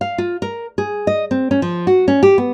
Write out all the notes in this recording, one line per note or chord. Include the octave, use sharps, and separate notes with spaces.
F5
F4
A#4
G#4
D#5
C4
C#4
F3
F#4
C#4
G4
B3